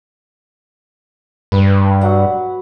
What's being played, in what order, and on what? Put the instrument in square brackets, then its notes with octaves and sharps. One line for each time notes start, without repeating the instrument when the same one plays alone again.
[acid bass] G2 [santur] B4
[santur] F#3 F#5